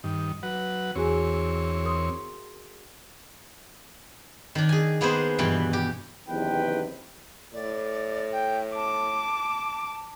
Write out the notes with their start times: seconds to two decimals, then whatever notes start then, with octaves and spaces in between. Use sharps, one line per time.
0.04 G2 D#3
0.43 F#3 B4 F#5
0.95 E2 C4 F#4 G#4 C#5 G#5
1.85 A#4 C6 D#6
4.55 D#3 D4
4.69 G#4 G#5
5.01 A#3 B3 G#4 B4 C5
5.38 G2 B2 E3 B4 G5
5.73 G4
6.29 F#1 E2 C3 D#3 B4 G5
7.54 A2 D5
8.32 G5
8.75 A5 D6